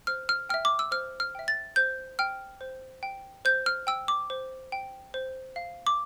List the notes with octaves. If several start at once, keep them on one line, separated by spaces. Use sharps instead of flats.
C5 F6
F6
E5 G5 F6
D6
E6
C5 F6
F6
E5 G5
A6
C5 G6
G5 F6
C5
G5
C5 G6
F6
G5 E6
D6
C5
G5
C5
F5
D6